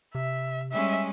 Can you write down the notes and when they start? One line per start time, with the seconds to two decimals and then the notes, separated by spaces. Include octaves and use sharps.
0.15 C3 E5
0.72 G3 G#3 C#4 E5